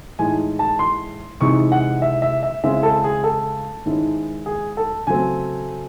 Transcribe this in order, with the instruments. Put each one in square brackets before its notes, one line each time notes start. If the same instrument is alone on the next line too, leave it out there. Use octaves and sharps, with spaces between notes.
[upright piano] A2 E3 G#3 D#4 G#5
A5
C6
C3 E3 G#3 D#4 C#6
F#5
E5
E5
E5
C#3 G#3 C4 E4 E5
A4
G#4
A4
G#2 D#3 G#3 C#4 E4
G#4
A4
C#3 F#3 A3 C4 G#5